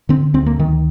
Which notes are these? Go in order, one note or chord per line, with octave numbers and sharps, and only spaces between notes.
D3 C4
D2 C4
A#3
D2 D#3